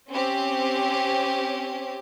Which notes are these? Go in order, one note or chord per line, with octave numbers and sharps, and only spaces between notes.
C4 C#4 G4